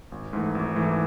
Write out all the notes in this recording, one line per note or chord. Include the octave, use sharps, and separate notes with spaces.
G#1
G#2 E3 A3
G#1
G#2 E3 A3